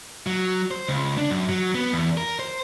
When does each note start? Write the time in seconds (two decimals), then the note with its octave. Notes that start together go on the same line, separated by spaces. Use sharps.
0.27 F#3
0.71 C5
0.88 C#2
1.17 D4
1.30 F#2
1.49 F#3
1.75 B3
1.93 E2
2.17 A#4
2.39 C5